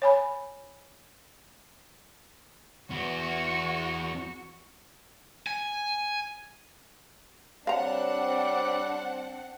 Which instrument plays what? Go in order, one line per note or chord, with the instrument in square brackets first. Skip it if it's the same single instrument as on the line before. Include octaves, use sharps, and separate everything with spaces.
[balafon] C#5 G#5 B5
[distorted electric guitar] E2 [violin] F#4 C#6
[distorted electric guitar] G#5
[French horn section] G3 C#5 D5 [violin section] C4 D4 F#5 [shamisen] F5 A#5